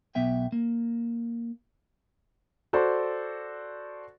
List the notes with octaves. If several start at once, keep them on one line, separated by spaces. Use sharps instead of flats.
B1 B3 E5 G5
A#3
F#4 A4 C5 D5